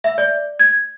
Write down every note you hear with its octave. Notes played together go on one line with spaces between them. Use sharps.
E5
D5
G#6